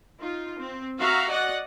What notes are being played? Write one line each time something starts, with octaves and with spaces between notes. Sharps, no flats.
D#4 F4
C4
F#4 E5 F5 A#5
D5 D#5 F#5